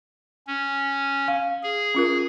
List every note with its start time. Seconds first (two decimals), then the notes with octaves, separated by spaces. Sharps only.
0.47 C#4
1.28 F5
1.63 G#4
1.95 C#4 F4 A#4